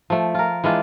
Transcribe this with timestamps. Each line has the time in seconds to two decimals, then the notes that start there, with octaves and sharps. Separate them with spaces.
0.10 F3 A3
0.35 F4 A#4
0.64 E3 G#3 D4 F4